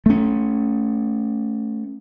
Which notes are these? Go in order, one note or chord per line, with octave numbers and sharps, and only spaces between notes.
A3 C#4